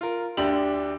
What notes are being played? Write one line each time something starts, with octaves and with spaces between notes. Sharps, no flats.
F4 A#4
D2 D3 D4 G4 F#7